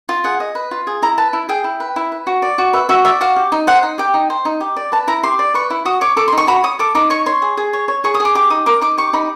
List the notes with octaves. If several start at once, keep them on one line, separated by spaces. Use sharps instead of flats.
F4
G#4 F#5
D#5
B4
F4
G#4
E4 A#5
B4 A5
E4
G#4 G5
E4
B4
E4
B4
F#4
D5
F#4
B4 E5
F#4 E5
D5 E5
F#4 F5
G4
D#4
C5 F#5
D#4
G4 G5
D#4
C5
D#4
G4
D5
B4 A5
E4 A#5
G4 C6
D5
B4 C#6
E4
F#4 D#6
C#5 D6
A4 D6
C6
D#4
C#6
F#4 B5
C#5 D#6
A4 D6
D#4 D6
C#5 C#6
C#5 C6
G#4
G#4
C#5
C#5
G#4 C#6
D#6
G#4
D6
G4 D6
D#4 D#6
A#4 D6
D#4 D6
G4 C#6
D#4 B5